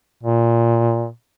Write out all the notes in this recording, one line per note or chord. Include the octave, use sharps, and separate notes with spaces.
A#2